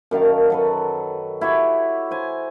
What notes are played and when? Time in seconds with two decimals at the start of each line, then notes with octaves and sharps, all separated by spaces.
0.11 F#2 D#3 F5 A5
0.50 F#3 A4 B4
1.41 E4 F#4 G4 C#5
2.11 C5 G#5